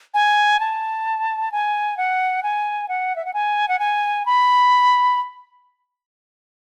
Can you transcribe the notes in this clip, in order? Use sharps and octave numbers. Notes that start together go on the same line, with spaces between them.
G#5
A5
G#5
F#5
G#5
F#5
E5
F#5
G#5
F#5
G#5
B5